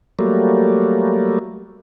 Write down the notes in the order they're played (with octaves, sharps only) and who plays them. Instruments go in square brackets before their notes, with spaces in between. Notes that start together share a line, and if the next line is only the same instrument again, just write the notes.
[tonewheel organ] F#3 G3 A3 A#3